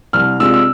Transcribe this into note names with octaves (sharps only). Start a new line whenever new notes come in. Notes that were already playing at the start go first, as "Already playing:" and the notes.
C2 F6
C3 G#3 D4 F4 E6
E6